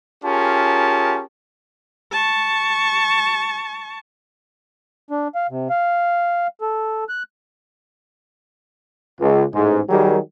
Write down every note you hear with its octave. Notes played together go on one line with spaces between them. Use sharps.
C#4 F4 G4 G#4 A#4 A5
A5 C#6
D4
F5
C3
F5
A4
F#6
C#2
A1 G#2 G#3
D#3 F#3 G3 G4 G#4 A#4